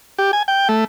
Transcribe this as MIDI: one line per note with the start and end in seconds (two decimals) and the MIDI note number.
0.19 0.31 67
0.33 0.43 80
0.48 0.68 79
0.69 0.84 57